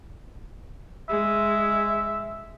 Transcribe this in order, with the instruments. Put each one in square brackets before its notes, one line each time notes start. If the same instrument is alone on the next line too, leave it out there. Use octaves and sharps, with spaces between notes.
[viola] G#3 [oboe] E5